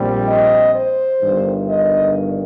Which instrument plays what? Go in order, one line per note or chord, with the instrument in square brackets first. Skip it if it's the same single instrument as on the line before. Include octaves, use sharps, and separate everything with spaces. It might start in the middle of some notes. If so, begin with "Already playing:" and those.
Already playing: [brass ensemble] A#1 A#2 G3 C4
D#5
C5
G1 G2 D#3
D#5